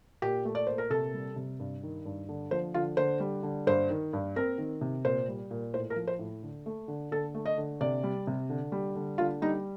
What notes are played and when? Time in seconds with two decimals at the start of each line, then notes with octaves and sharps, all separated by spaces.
0.22 A#2 G4
0.45 A3
0.55 D5
0.67 A#2 C5
0.78 A#4
0.90 C3 A4
1.14 G3
1.36 C3
1.59 G2
1.83 D#3
2.05 G2
2.29 D3
2.51 F3 C5
2.74 D3 F4
2.97 D3 C5
3.20 G3
3.43 D3
3.67 G2 C5
3.90 D#3
4.13 G2
4.36 C4 A#4
4.58 D#3
4.81 C3
5.05 A#2 C5
5.28 G3
5.51 A#2
5.74 A2 C5
5.90 A#4
5.96 F3
6.08 C5
6.19 A2
6.43 D3
6.66 A3
6.88 D3
7.11 D3 A4
7.35 A3
7.46 D#5
7.58 D3
7.81 C3 D5
8.04 G3
8.27 C3
8.49 D3
8.72 G3
8.96 D3
9.18 D3 F4
9.42 G3 D#4